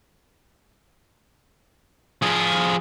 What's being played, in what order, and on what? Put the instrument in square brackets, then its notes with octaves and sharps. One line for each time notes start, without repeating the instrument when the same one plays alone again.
[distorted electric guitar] F3 G#4